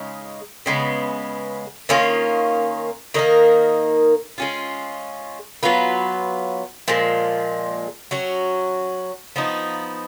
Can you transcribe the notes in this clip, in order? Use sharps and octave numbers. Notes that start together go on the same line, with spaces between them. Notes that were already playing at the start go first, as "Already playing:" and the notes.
Already playing: C#3 G#3 D#4
C#3 G#3 B3
D#3 A#3 C#4 F4
D#3 A#3 D#4 A#4
G#3 C#4 F4
F#3 B3 F4 B4
A#2 F3 G#3
F#3 C#4 F#4
F3 B3 D#4